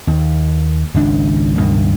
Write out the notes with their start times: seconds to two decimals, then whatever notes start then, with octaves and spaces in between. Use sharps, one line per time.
0.07 D#2
0.94 G#1 C#2 D4
1.58 C#2 G2 B2 D#3